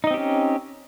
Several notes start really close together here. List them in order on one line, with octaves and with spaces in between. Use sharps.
D#4 D#5 C4 G4 C#4